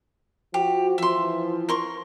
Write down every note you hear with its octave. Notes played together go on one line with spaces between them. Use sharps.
F3 F#4 G4
E3 F3 E5 C6
A#4 C6 C#6